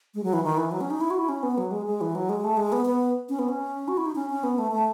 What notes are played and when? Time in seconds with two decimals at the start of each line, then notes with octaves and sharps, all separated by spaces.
0.14 G#3
0.23 F#3
0.33 E3
0.44 D#3
0.57 E3
0.71 F#3
0.81 C#4
0.90 D#4
1.01 E4
1.10 F#4
1.19 E4
1.29 C#4
1.43 B3
1.58 F#3
1.71 G#3
1.86 G#3
2.01 E3
2.15 F#3
2.29 G#3
2.44 A3
2.57 G#3
2.72 B3
2.86 B3
3.29 C#4
3.39 B3
3.49 C#4
3.88 F#4
3.97 E4
4.06 D#4
4.15 C#4
4.30 C#4
4.43 B3
4.58 A3
4.72 A3